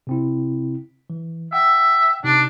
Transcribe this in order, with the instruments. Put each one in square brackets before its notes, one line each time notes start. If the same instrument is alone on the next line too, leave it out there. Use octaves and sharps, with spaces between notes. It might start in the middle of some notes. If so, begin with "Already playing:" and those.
[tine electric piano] C3 C4 E4
E3
[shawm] E5 [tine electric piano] F#5 G5 E6
[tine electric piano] C3 D#4 [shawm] D4